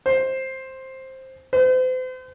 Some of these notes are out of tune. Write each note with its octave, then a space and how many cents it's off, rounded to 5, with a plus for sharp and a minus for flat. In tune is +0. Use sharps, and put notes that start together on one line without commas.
C5 +10
C5 -40